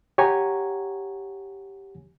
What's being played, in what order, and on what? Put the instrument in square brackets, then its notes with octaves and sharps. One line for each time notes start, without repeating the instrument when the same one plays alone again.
[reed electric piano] G4 C#5 F#5 G#5 A#5 C#6